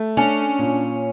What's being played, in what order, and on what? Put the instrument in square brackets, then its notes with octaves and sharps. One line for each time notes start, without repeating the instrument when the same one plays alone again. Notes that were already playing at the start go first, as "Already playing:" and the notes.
Already playing: [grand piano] A3
[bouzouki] C#4 [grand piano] D4
[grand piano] A#2